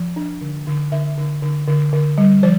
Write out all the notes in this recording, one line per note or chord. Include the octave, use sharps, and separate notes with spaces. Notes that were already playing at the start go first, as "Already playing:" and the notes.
Already playing: F3
D4
D3
D3
D3 E5
D3
D3
D3
D3
G3
F3 C5